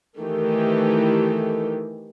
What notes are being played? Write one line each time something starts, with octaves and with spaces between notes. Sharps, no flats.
D#3 E3 A3 G4